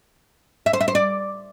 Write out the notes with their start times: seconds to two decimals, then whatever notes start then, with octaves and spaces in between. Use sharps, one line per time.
0.66 E5
0.73 C5
0.81 E5
0.88 C5
0.95 D5